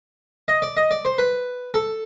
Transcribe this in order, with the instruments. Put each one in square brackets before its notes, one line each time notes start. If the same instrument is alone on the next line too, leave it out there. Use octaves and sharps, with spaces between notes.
[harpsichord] D#5
D5
D#5
D5
C5
B4
A4